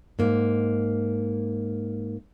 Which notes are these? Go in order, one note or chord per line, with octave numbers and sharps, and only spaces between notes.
G#2 A#3